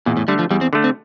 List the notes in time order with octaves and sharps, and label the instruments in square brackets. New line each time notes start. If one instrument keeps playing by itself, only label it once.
[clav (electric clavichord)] E2 [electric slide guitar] A#2
[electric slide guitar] A2
[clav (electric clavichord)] D3 A3 [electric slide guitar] G3
[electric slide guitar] F3
[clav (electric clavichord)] E2 [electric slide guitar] G3
[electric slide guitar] C4
[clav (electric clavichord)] D3 A3
[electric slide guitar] C4